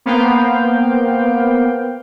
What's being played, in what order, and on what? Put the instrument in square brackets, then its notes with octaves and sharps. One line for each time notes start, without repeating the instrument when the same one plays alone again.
[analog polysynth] A#3 B3 C5 F5 G5